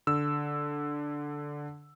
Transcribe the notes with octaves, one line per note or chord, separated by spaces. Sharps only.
D3 E6